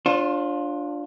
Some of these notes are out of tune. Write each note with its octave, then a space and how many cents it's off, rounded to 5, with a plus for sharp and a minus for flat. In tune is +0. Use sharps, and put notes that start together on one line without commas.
D4 +0 F4 +10 C#5 -45